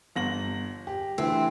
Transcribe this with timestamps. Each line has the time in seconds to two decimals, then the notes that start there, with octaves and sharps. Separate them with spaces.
0.15 G1 A#6 F#7
0.87 G4
1.18 D3 E3 A3 C4